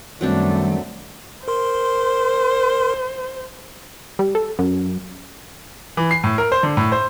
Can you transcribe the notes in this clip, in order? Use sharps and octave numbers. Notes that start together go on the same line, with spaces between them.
F#2 D#3 F#3 G3 A3 C4 D4
A#4 C5 C6
G3
A4
F#2
E3
C7
A2
A#4
C5
D3
A2
C5